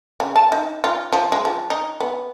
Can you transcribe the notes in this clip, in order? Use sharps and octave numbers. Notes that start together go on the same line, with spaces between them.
C#3
A5
D#4
F4
F3
G#3
F3
D#4
B3